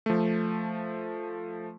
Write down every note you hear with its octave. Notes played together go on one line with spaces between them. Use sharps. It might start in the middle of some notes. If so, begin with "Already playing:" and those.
F3 A3